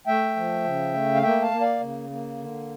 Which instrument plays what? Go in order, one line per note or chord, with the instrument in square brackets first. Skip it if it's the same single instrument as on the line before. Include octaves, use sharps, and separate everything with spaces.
[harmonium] A3 E5 G5
F3
C#3
A3
F5
A#3 E5 G5
F5 A5
A#3
D5 F5
C#3
A#3
D3